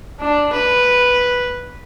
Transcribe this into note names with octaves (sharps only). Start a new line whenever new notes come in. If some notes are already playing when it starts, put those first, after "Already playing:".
D4
B4